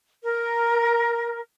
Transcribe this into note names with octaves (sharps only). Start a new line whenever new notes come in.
A#4